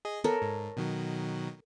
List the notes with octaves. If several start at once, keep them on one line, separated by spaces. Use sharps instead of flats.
G#4 D#5
B3 A4 A#4 C#5
G#2
B2 D#3 F#3